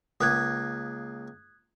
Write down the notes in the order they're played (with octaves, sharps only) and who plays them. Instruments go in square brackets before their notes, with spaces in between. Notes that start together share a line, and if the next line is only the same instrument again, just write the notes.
[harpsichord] C#2 A#3 [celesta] D#6 F#6 G#6